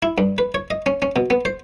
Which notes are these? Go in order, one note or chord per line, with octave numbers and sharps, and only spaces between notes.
E4
G2
B4
C#5
D#5
C#4
C#4
B2
B3
C5